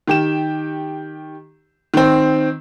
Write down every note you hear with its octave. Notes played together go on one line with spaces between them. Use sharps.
D#3 G4 E7
D#3 C4